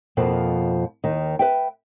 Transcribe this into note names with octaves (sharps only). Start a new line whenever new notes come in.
F2 B2 F3 A#3
D#2 D#3 D#5
B4 E5 G5